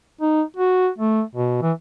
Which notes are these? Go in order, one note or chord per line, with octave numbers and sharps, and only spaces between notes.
D#4
F#4
A3
B2
E3